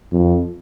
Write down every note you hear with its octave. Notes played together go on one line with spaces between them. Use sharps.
F2